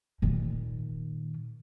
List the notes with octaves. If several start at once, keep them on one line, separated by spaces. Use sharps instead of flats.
A#2 D#3